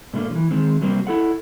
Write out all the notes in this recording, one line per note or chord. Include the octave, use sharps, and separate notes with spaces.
G#2 B2 A3 A#3 D4
E3 F3
D#3 G#3 C4
C3 F#3 G3 A#3 C4
E4 A4 F#5